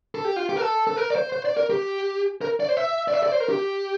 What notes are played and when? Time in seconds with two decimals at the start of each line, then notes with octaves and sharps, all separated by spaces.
0.15 A4
0.25 G4
0.36 F4
0.49 G4
0.56 A#4
0.61 A4
0.87 A4
0.96 A#4
1.10 D5
1.16 C5
1.32 C5
1.45 D5
1.57 A#4
1.70 G4
2.41 A#4
2.60 D5
2.69 C5
2.77 E5
3.08 D5
3.14 E5
3.23 D5
3.32 C5
3.40 A#4
3.49 G4